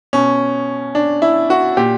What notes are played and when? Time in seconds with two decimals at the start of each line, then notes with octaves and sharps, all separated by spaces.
0.13 B2 C#4
0.95 D4
1.22 E4
1.50 F#4
1.77 A#2 G4